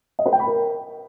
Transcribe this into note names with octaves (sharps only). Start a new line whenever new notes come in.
D#5
B4
G5
B5
A#4